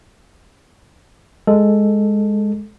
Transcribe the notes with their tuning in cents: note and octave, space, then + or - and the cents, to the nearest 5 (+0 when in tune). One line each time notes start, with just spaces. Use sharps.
G#3 +0 A4 +0